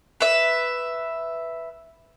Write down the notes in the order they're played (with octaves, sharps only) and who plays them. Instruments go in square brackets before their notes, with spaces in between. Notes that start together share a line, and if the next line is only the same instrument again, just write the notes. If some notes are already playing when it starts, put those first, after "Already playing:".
[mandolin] B4 E5